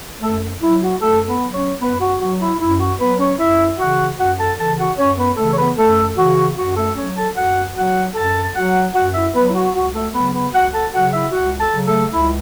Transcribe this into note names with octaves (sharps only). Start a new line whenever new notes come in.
F#2 A3 A4
F#3 E4
F#4
F#2 A3 A4
B3 B4
F#3
C#4 C#5
F#2 B3 B4
F#4
F#3 F#4
E4
F#2 E4
F#4
F#3 B3 B4
C#4 C#5
F#2 E4 E5
C#3 E3 F#4 F#5
F#2 F#4 F#5
A4 A5
C#3 E3 A4 A5
F#4 F#5
F#2 C#4 C#5
B3 B4
C#3 E3 A3 A4
C#5
B3 B4
F#2 A3 A4
C#3 E3 F#4
F#2 F#4
A3 A4
F#3 C#4 C#5
A4 A5
F#2 F#4 F#5
F#3 F#4 F#5
F#2 A4 A5
F#3 F#4 F#5
F#2 F#4 F#5
E4 E5
F#3 B3 B4
E4
F#4
C#2 F#4
A3 A4
C#3 F#3 B3 B4
B3 B4
C#2 F#4 F#5
A4 A5
C#3 F#3 F#4 F#5
E4 E5
C#2 F#4 F#5
A4 A5
C#3 F#3
A3 A4
C#2 E4